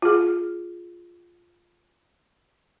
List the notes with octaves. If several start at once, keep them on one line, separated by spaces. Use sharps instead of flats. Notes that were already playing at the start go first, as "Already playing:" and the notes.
F4 G#4